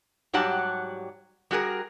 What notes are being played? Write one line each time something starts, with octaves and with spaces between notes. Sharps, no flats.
G#2 F#3 G3 G4 F#5 A5
G3 F#4 G#4 A#4